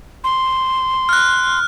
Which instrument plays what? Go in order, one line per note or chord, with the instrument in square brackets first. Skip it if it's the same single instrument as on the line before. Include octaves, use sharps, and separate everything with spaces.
[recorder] C6
[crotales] F6 F#6